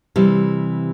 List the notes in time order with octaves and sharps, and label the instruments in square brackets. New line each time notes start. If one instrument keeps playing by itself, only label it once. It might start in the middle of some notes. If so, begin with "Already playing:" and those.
[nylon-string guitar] C3 E3 G3